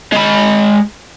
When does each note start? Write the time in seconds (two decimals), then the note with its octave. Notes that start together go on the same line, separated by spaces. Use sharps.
0.12 G#3 B5